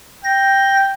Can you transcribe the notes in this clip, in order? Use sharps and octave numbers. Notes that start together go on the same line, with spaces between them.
G5 A#6